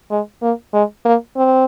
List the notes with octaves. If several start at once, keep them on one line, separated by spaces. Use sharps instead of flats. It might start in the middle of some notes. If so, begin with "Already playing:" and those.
G#3
A#3
G#3
A#3
C4